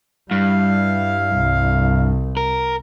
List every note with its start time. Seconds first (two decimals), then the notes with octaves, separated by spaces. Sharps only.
0.31 G2 G3 E4 F5
1.36 C2
2.37 A#4